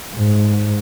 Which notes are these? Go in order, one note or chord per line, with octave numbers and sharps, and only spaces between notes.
G#2